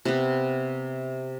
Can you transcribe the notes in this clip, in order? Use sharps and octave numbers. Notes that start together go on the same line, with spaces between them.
C3 B3